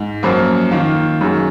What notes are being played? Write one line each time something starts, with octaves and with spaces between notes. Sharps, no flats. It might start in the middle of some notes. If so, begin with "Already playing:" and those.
Already playing: G#2
F#2 F3 A#3
D#3 A#3 F4
F#2 D#3 G#3